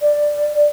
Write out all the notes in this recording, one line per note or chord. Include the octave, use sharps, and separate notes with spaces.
D5